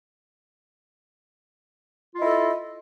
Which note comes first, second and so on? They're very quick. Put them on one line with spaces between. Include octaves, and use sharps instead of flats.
F4 D#5 E4 A4